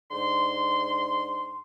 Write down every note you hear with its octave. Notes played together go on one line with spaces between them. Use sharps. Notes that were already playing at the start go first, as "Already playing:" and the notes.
G#2 D3 C6